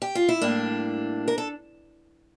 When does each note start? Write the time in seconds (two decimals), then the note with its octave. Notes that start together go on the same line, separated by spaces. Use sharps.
0.02 G4
0.15 F4
0.29 E4
0.41 A2 G3 A#3 D4
1.28 A#4
1.38 A4